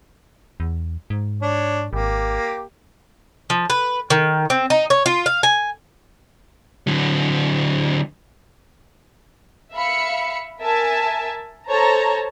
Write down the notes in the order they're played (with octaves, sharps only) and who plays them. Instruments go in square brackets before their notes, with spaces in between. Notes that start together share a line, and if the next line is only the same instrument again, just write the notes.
[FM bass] E2
G#2
[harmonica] D4 C#5
[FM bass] G#1 [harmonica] A#3 G4
[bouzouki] F3
B4
D#3
C4
D#4
C#5
F4
F5
G#5
[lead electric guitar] D3 F#3
[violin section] E5 F5 B5 C#7
A#4 E5 G#5 A5
A4 C5 C#5 A5 A#5